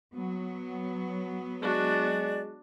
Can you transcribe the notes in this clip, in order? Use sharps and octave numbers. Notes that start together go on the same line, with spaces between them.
F#3 B3
G#3 D4 F#4 D5